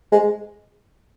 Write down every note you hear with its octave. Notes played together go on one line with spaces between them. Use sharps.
G#3